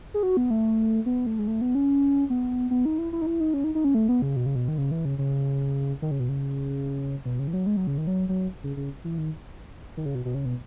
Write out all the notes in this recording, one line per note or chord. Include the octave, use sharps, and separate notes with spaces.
G#4
F#4
B3
A3
B3
A3
G#3
A3
B3
C#4
B3
B3
D#4
E4
E4
D#4
E4
D#4
C#4
D#4
D#4
C#4
A3
B3
C#3
B2
C#3
B2
D#3
C#3
E3
C#3
C#3
D#3
C#3
B2
C#3
B2
C#3
E3
F#3
G#3
F#3
C#3
D#3
F#3
F#3
C#3
C#3
E3
D#3
D#3
C#3
B2
B2
C#3
B2